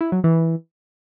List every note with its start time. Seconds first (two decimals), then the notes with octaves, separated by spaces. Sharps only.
0.01 E4
0.12 F#3
0.24 E3